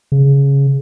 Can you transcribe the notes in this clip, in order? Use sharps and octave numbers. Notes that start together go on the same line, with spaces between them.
C#3